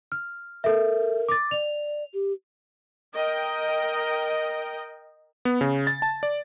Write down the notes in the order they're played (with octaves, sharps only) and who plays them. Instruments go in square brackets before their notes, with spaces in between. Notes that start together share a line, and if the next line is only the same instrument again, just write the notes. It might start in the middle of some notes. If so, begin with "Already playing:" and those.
[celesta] F6
[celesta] A4 E5 [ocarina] A#4
[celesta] D6 A6
[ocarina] D5 [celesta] F7
[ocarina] G4
[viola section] A#4 D#5 G5
[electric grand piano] B3
C#3
A6
A5
D5